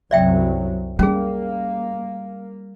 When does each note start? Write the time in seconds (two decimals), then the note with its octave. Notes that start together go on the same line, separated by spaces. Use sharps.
0.11 C2 F#2 F#3 D5 E5 G5
0.99 G3 A#3 C#4 G#4